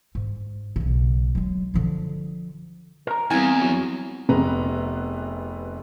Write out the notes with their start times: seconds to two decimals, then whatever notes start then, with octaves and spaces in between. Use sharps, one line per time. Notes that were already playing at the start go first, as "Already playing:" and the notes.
0.15 G#2
0.76 B1 C#3
1.35 F#3 G#3
1.74 D3 F3
3.07 A#4 A#5
3.30 E2 G3 C4 E4 G#4 G#5
3.61 F2 F#3
4.29 F1 C3 B3 G#4 B4 A#5